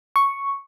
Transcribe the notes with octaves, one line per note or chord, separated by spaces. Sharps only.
C#6